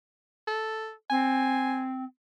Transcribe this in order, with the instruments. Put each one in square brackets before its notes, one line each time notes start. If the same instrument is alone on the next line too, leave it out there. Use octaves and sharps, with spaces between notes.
[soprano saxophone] A4
[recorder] C4 [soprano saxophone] G#5